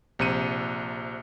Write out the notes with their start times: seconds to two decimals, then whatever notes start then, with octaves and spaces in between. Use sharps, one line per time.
0.19 A#1 C3 C#7 D#7